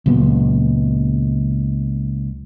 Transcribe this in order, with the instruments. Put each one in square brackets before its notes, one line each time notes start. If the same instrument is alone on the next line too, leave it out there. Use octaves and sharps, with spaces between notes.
[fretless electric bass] C#2 A#2 F#3 B3